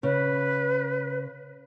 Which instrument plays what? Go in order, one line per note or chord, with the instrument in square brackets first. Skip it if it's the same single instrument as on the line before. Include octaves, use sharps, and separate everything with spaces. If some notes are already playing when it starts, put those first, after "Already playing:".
[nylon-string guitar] C#3 [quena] B4